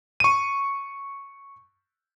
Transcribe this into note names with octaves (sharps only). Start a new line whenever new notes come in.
C#6 D#7